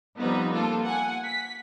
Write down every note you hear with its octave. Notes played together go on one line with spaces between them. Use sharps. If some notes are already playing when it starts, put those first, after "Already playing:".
F3 G3 B3 C4 D#4 B4
A#3 F4 A4
F#5 G#5
B6